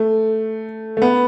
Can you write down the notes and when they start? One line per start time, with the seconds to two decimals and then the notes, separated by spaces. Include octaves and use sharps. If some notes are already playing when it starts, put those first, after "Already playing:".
Already playing: A3
0.97 A3
1.02 B3